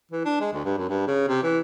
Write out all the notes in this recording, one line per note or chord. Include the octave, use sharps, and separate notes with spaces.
E3
D4
G#3
D2
G2
F#2
G2
C#3
C3
E3